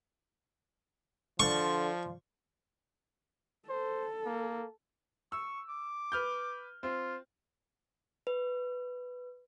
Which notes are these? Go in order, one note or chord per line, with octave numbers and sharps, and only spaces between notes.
D3 F3 C5 D5 F5 C#6
A4 C5
A#3
C#6 E6
D6
B4 F6 G6
C4 F4
B4